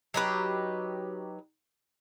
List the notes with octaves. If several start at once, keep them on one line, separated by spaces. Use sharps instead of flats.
F#3 D#4 G4 B4